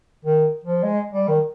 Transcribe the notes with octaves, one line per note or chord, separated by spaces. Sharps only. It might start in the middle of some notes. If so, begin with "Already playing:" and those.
D#3
F3
G#3
G3
D#3